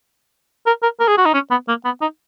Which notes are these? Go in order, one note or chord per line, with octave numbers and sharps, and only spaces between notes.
A#4
A#4
A#4
G#4
F#4
D#4
C#4
B3
A#3
B3
D#4